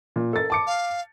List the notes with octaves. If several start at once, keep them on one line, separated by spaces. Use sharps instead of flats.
A#2
A4 A#4 A6
A5 D6 C#7
F5